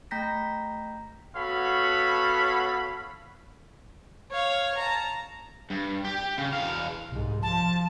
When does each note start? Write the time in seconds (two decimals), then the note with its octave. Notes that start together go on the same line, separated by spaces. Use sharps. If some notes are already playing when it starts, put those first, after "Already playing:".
0.11 A3 G5 A#5 G6 A#6 B6
1.36 B3 F#4 A4 C#5 F5 B5
4.32 C#5 F5
4.77 A5 A#5
5.70 G2
6.05 G4
6.38 C#3
6.53 E2 F5
7.09 C2 G#2
7.43 F3 A5